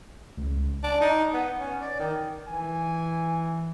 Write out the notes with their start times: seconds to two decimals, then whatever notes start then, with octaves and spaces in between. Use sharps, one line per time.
0.38 C#2
0.83 D4
1.01 D#4
1.34 B3
1.59 C#4
1.81 D5
1.99 D#3
2.48 E3 G#5